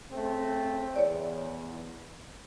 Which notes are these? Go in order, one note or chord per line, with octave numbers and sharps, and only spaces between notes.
C#3 A3 C4
E2 C#5 D5